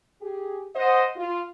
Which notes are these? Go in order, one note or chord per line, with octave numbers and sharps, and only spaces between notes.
G4 G#4
C5 D#5 F#5
F4